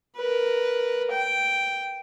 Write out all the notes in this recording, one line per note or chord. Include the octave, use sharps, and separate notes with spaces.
A#4 B4
G5